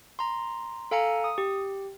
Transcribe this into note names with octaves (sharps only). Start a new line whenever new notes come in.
A#5 C6
A4 F5 G#5 A#5 C#7
D#6
G4